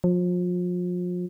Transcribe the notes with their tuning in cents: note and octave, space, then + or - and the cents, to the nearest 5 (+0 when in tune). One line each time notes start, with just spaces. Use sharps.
F3 +35